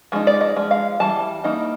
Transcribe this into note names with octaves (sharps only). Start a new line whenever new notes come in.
F3 G#3 D#4
D5
D#5
F3 G#3
F5
E3 G3 A5
E3 G3 A#3 D#4